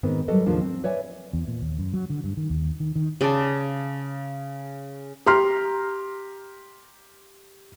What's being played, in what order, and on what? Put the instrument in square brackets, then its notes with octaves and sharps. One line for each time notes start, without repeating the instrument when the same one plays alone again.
[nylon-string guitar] G#2 D#3 B3 C4
F#3 G3 A4 B4 D#5
D#2 G#2 C#3 F3 A#3 D4
C4
B4 C#5 D5 E5 G#5
[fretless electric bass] E2
A#2
D#2
F#2
F#3
D3
G2
D#3
D#2
D#3
D#3
[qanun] C#3 G#4 D5 A5
[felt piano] G4 A#5 C6 F6